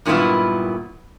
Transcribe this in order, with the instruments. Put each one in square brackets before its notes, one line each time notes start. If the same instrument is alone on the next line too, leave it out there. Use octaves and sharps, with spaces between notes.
[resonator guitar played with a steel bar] G2 A#2 D#3 F#3 B3 E4